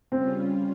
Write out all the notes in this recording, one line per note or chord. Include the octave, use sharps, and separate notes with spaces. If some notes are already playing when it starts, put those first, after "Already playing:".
C#3 G3 C4 C#4 F4